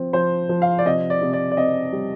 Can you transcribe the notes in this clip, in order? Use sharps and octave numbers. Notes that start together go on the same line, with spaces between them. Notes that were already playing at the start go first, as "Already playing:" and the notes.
Already playing: F3 C4
F3 C5
F3
F5
D5
C3 D#5
D5
C3
D5
D5
C4 D#5
G3